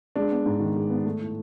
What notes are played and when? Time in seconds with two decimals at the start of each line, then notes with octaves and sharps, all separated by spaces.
0.16 G#3 D4
0.31 B3
0.46 G#2
0.60 D#3
0.76 G#3
0.90 B3
1.05 A3
1.21 A2